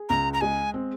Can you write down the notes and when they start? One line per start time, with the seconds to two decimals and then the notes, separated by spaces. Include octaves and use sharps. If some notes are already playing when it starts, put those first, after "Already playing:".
Already playing: G#4
0.09 C#2 A#5
0.33 A#5
0.41 G#3 G#5
0.74 C4